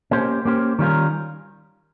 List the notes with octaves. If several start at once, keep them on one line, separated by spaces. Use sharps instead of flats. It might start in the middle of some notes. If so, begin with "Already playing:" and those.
A#3 C#4 G4 C5
A#3 C#4 G4 C5
D#3 G3 C#4 F4 A#4